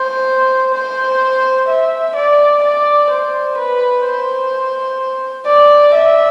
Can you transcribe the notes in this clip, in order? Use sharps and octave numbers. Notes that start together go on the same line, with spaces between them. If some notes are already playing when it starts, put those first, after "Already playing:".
Already playing: C5
C5
E5
D5
D5
C5
B4
C5
D5
E5